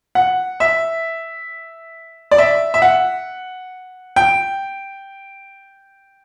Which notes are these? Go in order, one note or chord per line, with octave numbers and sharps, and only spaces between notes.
F#5
E5
D5
E5
E5
F#5
G5